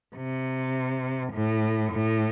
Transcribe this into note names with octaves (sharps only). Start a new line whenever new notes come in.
C3
A2
A2